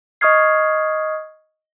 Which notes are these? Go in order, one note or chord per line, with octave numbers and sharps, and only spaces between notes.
D#5 C#6 D#6 F6 G#6 C7